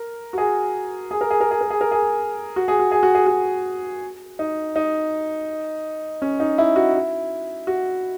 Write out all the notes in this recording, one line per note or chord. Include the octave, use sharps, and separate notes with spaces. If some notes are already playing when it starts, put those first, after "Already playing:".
Already playing: A#4
F#4
G#4
G#4
A#4
G#4
A#4
G#4
A#4
G#4
A#4
G#4
F#4
G#4
F#4
G#4
F#4
G#4
F#4
D#4
D#4
C#4
D#4
E4
F#4
E4
F#4